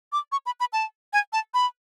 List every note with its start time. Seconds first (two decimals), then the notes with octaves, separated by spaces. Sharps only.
0.12 D6
0.32 C#6
0.46 B5
0.60 B5
0.73 A5
1.13 G#5
1.33 A5
1.54 B5